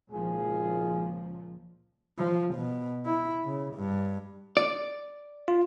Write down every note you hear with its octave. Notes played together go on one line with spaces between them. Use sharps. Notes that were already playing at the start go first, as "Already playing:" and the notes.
G#1 C#2 A#2 F3 F4 G#4
F3
B2
E4
C#3
G2
D5
F4